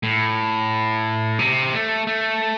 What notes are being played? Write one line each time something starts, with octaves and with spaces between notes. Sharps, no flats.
A2
C3
A3
A3